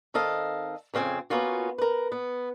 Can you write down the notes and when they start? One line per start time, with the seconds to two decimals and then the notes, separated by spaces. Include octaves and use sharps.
0.14 D#3 C4 A4 D#5 F5
0.94 F2 C#3 C4 G#5
1.30 A#3 B3 C#4 F4 F#4
1.78 A#4 B4
2.12 B3